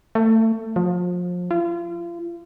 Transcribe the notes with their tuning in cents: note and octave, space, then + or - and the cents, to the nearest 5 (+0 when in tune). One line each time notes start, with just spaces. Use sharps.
A3 +25
F3 +30
F4 -35